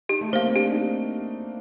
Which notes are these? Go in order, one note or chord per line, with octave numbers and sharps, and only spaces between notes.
D#4 G4
A3
A#3 C5 F5
C4
D4 G4
D#4